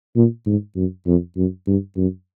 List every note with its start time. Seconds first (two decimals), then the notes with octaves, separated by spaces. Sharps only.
0.16 A#2
0.46 G#2
0.76 F#2
1.06 F2
1.37 F#2
1.67 G2
1.97 F#2